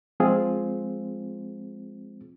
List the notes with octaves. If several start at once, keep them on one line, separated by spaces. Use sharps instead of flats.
F3 G#3 C4 F4 G#4